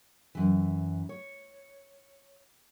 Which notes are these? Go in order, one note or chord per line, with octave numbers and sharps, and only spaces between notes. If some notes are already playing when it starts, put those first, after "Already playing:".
F#2 E3
C#5